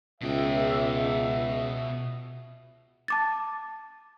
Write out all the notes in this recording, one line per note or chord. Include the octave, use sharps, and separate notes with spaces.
C#2 B2 E5 G5
A5 D6 A6